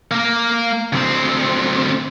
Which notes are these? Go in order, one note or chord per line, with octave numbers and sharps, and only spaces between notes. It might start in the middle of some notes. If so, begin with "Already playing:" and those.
A#3 A#4
D2 C4